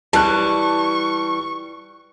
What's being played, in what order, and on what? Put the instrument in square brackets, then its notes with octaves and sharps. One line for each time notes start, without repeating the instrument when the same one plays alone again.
[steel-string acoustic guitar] E3 G3 [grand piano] A5 F#6 [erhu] C#6